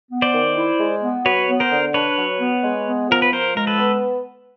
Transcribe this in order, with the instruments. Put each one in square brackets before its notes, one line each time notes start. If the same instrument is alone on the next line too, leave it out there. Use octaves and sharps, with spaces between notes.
[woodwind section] B3
[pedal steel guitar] C5 D5
[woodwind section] D#3
E4
G#3
B3
[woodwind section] F#3 [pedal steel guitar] B4 C#5
[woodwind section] B3
[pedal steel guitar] A#4 C5
[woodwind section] D3
[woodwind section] D4 [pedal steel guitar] B4 C#5
[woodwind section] F#3
B3
G#3
B3
[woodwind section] F3 [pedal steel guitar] A#4
[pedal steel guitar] B4
[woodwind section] F3 [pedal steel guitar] A#4 C5
[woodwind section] G#3 [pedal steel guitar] A#4
[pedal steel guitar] A4 B4
[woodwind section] B3